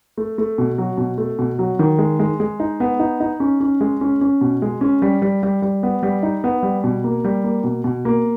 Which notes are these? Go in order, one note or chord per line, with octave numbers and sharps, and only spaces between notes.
A3
A3
B2
F#3
B2
A3
B2
F#3
D#3
G#3
G#3
G#3
D#4
B3
D#4
D#4
C#4
C#4
G#3
C#4
C#4
B2
G#3
C#4
G3
G3
G3
G3
B3
G3
D#4
B3
G3
B2
A#3
G3
A#3
B2
B2
A#3